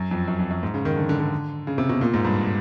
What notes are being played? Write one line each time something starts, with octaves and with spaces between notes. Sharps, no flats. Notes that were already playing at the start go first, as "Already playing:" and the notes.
Already playing: F#2
F2
F#2
F2
F#2
G#2
C#3
D#3
D3
D3
D3
C#3
C3
B2
A#2
G#2
G2